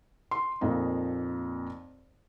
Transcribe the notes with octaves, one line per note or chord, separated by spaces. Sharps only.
C6
F2 A#2 A#3 D#4